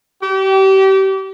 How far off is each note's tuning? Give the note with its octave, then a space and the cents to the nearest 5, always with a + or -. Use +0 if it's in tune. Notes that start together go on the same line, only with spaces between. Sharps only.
G4 -30